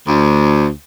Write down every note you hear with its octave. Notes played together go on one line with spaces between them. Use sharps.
D2